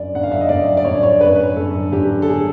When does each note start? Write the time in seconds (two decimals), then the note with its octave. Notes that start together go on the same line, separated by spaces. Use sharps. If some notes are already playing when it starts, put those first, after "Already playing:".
Already playing: F#2 D3 D5
0.14 F#2 D3 F#5
0.23 F5
0.32 E5
0.41 D#5
0.49 F#2 D3 D5
0.77 D5
0.85 F#2 D3 C#5
1.03 C#5
1.21 F#2 D3 B4
1.56 F#2 D3 A4
1.92 F#2 D3 G4
2.22 A4
2.28 D3 G#4